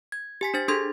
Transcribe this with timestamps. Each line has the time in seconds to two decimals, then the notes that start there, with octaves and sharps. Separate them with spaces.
0.12 G#6
0.41 G4 G#5 B6
0.54 D4 C5 A6
0.68 D4 G#4 A4 C6 G#6